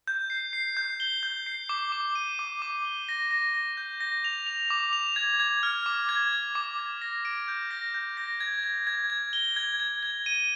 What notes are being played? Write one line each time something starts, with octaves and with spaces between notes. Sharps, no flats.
G6
C7
C7
G6
G7
G6
C7
D6
D6
D#7
D6
D6
G7
A#6
A#6
A#6
G6
A#6
F7
F7
D6
F7
G#6
G#6
F6
D6
G#6
G#6
D6
G#6
A#6
D7
G6
A#6
G6
A#6
G#6
G#6
G#6
G#6
G7
G#6
G#6
G#6
D#7